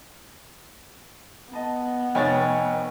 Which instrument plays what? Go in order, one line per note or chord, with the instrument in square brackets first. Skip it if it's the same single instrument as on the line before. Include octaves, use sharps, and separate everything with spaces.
[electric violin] B3 [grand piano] D#5 A5
[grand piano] F1 C#5 A6 [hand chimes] D#5 G5 G#5